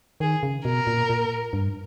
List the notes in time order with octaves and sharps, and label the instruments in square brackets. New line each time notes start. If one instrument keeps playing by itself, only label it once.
[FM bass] D#3 [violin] G#4
[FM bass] C#3
[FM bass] B2 [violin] A#4
[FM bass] A#2
A#2
G2